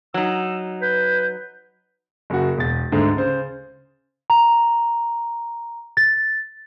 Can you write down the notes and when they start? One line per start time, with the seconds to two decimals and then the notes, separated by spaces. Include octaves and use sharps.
0.14 F#3 D#4 E6
0.82 B4 G6
2.30 F#1 F#4
2.57 E1 A6
2.92 D2 G#2 D3
3.17 C#3 C5
4.30 A#5
5.97 A6